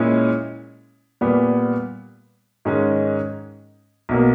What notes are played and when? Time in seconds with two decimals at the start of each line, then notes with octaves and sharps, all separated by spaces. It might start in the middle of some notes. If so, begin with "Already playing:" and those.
Already playing: A#2 G#3 C#4 E4 G#4
1.21 A#2 G3 B3
2.65 G#2 D#3 G#3 C#4
4.09 B1 B2 A#3